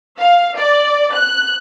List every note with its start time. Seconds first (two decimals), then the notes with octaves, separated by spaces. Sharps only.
0.18 F5
0.56 D5
1.13 F#6